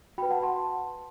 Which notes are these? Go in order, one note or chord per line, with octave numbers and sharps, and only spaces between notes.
F#4 B4 G5 B5
F#5 A5
A5 C6